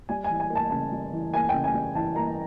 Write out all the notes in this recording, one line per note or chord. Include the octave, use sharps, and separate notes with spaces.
G3 G#5
G#5
E3
G#5
A#3
A5
C#3 A5
G3
E3
A#3 G#5
G5
C#3
G#5
G3
E3 A5
A#3 A#5